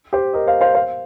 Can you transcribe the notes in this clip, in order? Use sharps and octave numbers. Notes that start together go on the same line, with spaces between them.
G4 C5
A#4 D#5
C5 F5
C5 F5
C5 F5